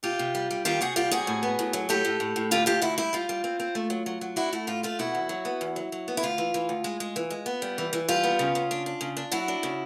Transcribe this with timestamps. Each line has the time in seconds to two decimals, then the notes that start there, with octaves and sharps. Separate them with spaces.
0.03 C3 F4 G4
0.19 C3
0.35 G3
0.51 G3
0.65 D#3 F4 G4
0.81 C3 F#4 G#4
0.96 G3 F4 G4
1.11 C3 F#4 G#4
1.27 A2
1.43 B3
1.59 A2
1.73 F#3
1.89 A2 G4 A4
2.05 A2
2.20 A2
2.36 A2
2.51 D3 F4 G4
2.66 D2 F4 G4
2.82 D2 E4 F#4
2.98 G3 E4
3.13 G3 F4
3.29 G3
3.44 C4
3.60 C4
3.75 A3
3.90 F#3
4.06 F#3
4.21 F#3
4.36 D4 E4 F#4
4.53 A3 E4
4.67 A2 F4
4.83 A3 F4
4.99 B2 E4 F#4
5.15 E2
5.29 F#3
5.45 B3
5.61 E2
5.76 F#3
5.92 F#3
6.08 B3
6.17 E4
6.23 D2 F4
6.38 E3
6.54 E3
6.69 D2
6.84 G#3
7.00 G#3
7.16 E3
7.30 G#3
7.46 B3
7.62 G3
7.78 E3
7.93 E3
8.08 G3 F4
8.24 B3
8.39 C#3
8.55 C#3
8.71 D4
8.86 D4
9.01 C#3
9.17 D4
9.32 F#3 E4 F#4
9.48 D4
9.63 C#3